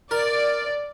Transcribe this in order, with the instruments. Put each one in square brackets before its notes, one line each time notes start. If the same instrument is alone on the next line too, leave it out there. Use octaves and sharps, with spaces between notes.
[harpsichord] A#4 [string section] D5